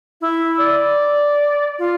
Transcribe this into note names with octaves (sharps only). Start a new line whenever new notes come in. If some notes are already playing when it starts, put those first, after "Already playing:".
E4
D5
F4